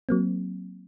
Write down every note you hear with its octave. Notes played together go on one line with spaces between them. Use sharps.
F#3 A#3 C4